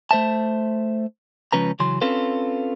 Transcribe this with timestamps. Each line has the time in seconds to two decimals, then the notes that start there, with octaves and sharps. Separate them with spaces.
0.11 A3 C5 E5 A5
1.52 C#2 G#2 F3 C#4 B4 A#5
1.80 C#3 E3 F#3 C6
2.01 C4 C#4 F4 A4 B4